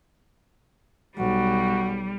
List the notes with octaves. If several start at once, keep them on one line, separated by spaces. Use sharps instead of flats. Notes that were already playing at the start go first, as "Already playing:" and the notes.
B1 G3 F#4